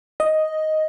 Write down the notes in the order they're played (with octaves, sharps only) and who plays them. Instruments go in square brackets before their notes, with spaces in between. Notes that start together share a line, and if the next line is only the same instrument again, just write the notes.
[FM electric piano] D#5